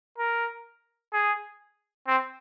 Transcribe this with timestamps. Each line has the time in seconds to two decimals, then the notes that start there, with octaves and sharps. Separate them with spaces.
0.19 A#4
1.13 G#4
2.08 C4